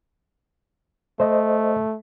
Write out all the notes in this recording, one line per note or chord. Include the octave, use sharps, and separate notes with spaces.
A3 C5 D#5